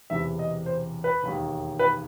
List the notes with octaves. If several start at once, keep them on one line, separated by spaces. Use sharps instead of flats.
E1 E2 C3 E3 E5
D#5
C5
B4
E1 D#2 D#3
B4